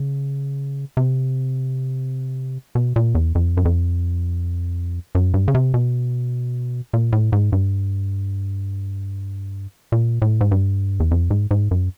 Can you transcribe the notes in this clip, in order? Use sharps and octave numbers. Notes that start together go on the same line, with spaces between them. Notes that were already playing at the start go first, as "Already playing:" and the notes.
Already playing: C#3
C3
B2
A#2
E2
F2
F#2
F2
F#2
G2
C#3
C3
B2
A#2
A2
G#2
G2
A#2
A2
G#2
G2
E2
F2
G#2
G#2
F#2